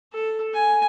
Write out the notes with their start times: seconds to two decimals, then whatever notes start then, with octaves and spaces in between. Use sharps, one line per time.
0.13 A4
0.54 G#5